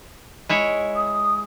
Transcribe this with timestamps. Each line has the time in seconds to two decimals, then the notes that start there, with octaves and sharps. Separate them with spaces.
0.49 G#3 E4 C#5
0.96 D#6